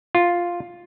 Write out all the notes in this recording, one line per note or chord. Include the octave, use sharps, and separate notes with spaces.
F4